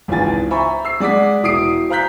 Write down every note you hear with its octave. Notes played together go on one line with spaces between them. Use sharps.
G#1 C#2 E3 F4 G#5 A6
C5 E5 G#5 A#5 B5 C#6
E6 C7
G#3 D5 F#5 D6 B6
E1 E4 D#6 C7 D7
C5 F5 A#5 F#6 G6 B6